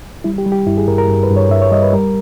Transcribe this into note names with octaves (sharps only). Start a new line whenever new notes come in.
G3 E4
G4
G3
G4
G2 E4
G#4
G2 A#4
A#4
G2
B4
G2
C#5
G2 E5
C#5
G3 D#5
B4
G3 A#4